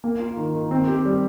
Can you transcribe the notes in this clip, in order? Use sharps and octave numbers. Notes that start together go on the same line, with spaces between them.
A#3
F4
D#3
D#3
C4
G4
G3